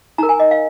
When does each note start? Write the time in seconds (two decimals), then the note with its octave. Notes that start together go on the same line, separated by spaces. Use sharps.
0.18 D#4 A#4 A#5
0.29 G#5
0.40 D#5
0.51 F5